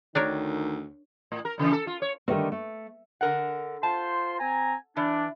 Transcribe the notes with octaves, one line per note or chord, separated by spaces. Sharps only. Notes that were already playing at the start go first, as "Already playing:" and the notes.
D2 D#3 D4 A#4 C#5
A2
A#4
A#2 C#3 E3
A4
F4
C#5
D3 D#3 G3 A3 C4
A3
D3 A#4 F#5
F4 C5 A5 C6
C4 G#5 A#5
E3 D4